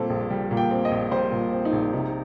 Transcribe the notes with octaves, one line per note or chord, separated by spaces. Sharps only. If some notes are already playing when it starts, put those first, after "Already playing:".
Already playing: A#2 G3 C4 A4
A#1
G3
A#2
G5
C4
D#5
A#1
G3 C5
A#2
C4
D#4
A#1
C3 D#4